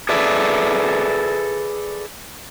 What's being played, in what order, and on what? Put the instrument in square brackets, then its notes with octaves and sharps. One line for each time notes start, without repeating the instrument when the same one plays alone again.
[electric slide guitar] G#4 A4 B4 D5 E5